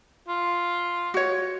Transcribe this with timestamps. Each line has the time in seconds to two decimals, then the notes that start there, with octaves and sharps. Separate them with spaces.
0.28 F4
1.14 F#4 C#5